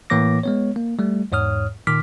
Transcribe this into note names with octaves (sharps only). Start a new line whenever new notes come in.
A2 E3 A#3 C#5 D6 A#6
G#3 B3 C#5
A#3
G3 A3
E2 G#2 C#5 D#6 F6
A#2 D#3 D6 F6 B6